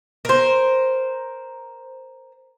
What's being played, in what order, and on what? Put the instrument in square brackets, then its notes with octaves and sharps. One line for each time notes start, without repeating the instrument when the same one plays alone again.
[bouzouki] A#4 C5